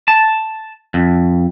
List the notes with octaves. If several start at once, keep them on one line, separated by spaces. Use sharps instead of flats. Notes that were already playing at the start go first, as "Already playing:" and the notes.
A5
F2